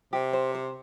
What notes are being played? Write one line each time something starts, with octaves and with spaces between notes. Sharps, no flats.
C3 G4
C5
C5